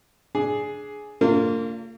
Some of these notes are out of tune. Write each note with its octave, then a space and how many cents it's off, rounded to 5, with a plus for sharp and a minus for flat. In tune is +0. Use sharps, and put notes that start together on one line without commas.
D4 +0 G#4 +10
A#3 -35 D4 -35 F4 +0